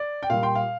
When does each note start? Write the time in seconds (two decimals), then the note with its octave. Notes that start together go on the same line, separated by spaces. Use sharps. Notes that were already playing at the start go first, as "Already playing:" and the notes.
Already playing: D5
0.23 G5
0.30 A#2 G3 F5
0.43 G5 C6
0.55 F5